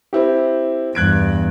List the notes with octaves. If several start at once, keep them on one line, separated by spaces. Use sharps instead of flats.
C4 E4 G4
E2 G2 F#6 G#6 D7